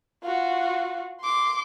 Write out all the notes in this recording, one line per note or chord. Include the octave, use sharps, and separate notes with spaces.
F4 F#4
C6 D6